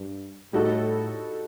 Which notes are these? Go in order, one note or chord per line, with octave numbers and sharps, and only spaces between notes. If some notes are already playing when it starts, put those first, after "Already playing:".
Already playing: G2
A2 G3 D#4 F#4 A4